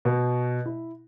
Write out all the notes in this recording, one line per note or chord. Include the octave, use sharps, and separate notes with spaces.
B2
E4